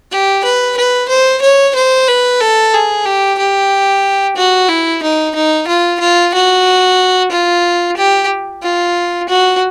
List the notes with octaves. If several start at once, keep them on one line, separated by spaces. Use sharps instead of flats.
G4
B4
B4
C5
C#5
C5
B4
A4
G#4
G4
G4
F#4
E4
D#4
D#4
F4
F4
F#4
F4
G4
F4
F#4